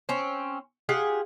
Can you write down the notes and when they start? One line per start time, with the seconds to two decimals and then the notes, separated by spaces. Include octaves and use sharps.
0.09 C4 C#4
0.89 F4 G4 G#4 F#5